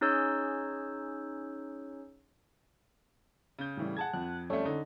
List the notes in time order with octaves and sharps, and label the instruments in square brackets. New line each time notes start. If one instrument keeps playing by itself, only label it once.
[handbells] C#4 D#4 G#4 C#5 E6 G6
[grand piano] C#3 G6
[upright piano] A2 E3 G3
[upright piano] G#4 [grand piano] F#5 A5 G#6
[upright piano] F2 [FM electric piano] F#6
[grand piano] G3 A3 [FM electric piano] C#4 A4 C#5
[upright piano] D3 [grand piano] D#4